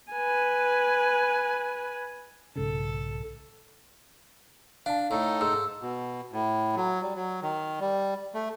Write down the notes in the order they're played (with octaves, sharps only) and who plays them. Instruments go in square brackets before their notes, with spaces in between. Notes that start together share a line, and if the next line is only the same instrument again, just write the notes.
[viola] B4 G#5
[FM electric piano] B1 G#2 C#3 [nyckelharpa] A4
[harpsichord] D4 [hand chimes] F5 A5
[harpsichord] A2 [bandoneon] D#4 A4
[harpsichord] G#2 [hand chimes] E6
[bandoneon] B2
A2
F#3
G3
F#3
D#3
G3
A3